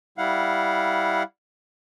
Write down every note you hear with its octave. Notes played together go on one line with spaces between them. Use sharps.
G3 E4 F5 F#5